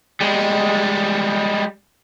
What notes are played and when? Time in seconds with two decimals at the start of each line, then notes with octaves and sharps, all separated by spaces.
0.21 G3 G#3